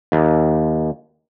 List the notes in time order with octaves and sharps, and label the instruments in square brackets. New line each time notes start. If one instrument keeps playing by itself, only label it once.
[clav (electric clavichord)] D#2